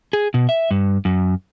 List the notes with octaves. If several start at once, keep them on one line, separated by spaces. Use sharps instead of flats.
G#4
B2
E5
G2
F#2